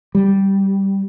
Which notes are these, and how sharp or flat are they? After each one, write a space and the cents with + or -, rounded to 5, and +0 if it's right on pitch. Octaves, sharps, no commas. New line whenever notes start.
G3 -5